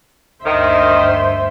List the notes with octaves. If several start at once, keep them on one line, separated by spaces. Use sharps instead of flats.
D2 G2 D#3 C5 E5